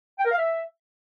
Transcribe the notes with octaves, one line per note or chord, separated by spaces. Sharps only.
G5
A#4
F5
E5